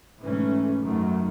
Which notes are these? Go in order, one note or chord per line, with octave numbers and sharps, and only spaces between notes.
G#2 E3 A3 C#4
F#2 D#3 F#3 A3